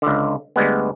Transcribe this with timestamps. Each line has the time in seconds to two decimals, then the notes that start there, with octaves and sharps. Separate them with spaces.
0.02 C#2 D3
0.56 D2 G3 G#3 B3